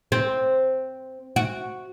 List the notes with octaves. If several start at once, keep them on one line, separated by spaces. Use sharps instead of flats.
C4
F#4